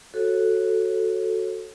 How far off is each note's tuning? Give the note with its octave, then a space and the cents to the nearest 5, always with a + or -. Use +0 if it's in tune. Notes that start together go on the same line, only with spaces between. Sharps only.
F#4 +0 A4 +0 C#5 -30